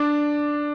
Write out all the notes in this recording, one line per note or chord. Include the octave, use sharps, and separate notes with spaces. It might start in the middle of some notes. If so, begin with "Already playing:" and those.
Already playing: D4